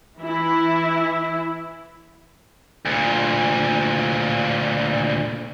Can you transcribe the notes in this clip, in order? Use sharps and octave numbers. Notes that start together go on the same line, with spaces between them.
E3 E4
D2 A#2